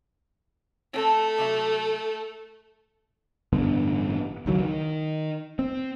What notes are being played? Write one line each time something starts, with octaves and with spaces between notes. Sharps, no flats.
A3 C4 A4 A5
C3 F#3 E5
A1 G2 D3 B3
C#2 D#3 F#3
D#3
C4